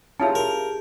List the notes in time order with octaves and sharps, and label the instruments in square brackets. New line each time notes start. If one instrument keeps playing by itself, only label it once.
[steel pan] C#4 E4 F4 [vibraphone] G4 G#4 [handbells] A5
[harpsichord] A#4